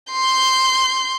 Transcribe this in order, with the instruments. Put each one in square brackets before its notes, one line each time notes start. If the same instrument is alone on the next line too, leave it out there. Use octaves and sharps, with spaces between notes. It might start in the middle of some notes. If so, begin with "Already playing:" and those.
[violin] C6 G6